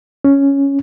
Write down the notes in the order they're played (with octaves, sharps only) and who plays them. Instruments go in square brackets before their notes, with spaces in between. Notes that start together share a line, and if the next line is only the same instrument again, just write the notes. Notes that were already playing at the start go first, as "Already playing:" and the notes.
[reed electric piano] C#4